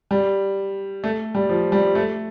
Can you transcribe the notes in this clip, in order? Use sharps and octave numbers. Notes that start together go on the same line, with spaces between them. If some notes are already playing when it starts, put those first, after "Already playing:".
G3
A3
G3
F3
G3
A3